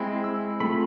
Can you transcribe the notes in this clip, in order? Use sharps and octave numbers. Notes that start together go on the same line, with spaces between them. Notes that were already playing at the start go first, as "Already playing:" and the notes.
Already playing: G#3 C4 E4
E6
A3 C4 F4 B5